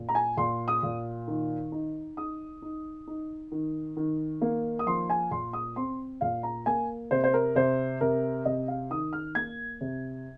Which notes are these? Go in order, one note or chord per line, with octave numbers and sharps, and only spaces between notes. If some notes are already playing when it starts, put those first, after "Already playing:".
Already playing: A#2
A#5
G#5
A#2 C6
D#6
A#2
D#3
D#4
D#4 D#6
D#4
D#4
D#3
D#3
A#3
D#6
F3 C6
G#5
A#2 C6
D#6
C4 C6
A#2 F5
A#5
A#3 G#5
C3 C5
C5
A#4
C3 C5
C3 A#4
C3 D#5
F5
D#3 D#6
F6
A#3 G#6
C3